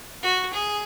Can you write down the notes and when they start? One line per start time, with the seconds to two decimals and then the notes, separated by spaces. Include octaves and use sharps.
0.23 F#4
0.53 G#4